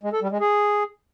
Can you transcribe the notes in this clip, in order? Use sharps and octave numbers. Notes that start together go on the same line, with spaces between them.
G#3
A4
G3
G#3
G#4